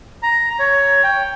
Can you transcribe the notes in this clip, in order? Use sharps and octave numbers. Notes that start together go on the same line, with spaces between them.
A#5
C#5
G5